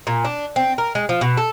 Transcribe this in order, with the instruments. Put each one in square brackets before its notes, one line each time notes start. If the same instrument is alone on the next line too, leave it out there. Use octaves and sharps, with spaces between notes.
[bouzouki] A#2
D4
C4
A#4
G#3
F3
B2
A4